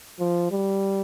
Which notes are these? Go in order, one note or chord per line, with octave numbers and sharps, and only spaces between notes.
F3
G3